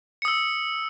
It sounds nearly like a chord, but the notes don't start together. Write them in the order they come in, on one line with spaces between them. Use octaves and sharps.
C#7 D#6 E6